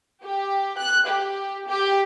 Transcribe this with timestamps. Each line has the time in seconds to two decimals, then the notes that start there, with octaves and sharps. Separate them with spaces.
0.24 G4
0.78 F#6
1.07 G4
1.68 G4